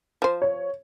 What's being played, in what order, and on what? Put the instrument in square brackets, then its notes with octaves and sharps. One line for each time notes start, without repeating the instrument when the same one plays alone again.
[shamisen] F3 C5
[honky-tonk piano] C#5